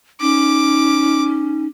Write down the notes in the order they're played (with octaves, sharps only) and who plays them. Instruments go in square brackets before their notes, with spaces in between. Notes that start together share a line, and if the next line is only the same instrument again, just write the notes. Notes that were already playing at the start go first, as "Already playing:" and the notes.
[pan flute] C#4 [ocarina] D#4 [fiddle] D6